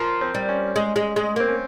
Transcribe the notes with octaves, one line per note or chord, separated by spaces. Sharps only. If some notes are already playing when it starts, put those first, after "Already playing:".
Already playing: F3 A#4
C4
G3
C#4
G#3
G#3
G#3
A#3 C4
C#4